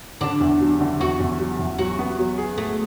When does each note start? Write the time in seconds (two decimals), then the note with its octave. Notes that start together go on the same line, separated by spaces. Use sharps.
0.21 D3 D4
0.40 E2
0.60 F#3
0.81 D3
1.00 E2 F#4
1.20 E2
1.40 F#3
1.59 E2
1.79 F#3 F#4
1.99 B3
2.19 F#3
2.38 G#4
2.58 A3 G#4